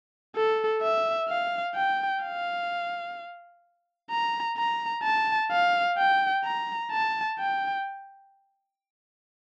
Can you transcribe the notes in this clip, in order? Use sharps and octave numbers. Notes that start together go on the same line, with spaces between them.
A4
E5
F5
G5
F5
A#5
A#5
A5
F5
G5
A#5
A5
G5